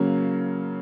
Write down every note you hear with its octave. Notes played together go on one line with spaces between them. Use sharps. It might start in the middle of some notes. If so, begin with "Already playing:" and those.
Already playing: C#3 F#3 A#3 C#4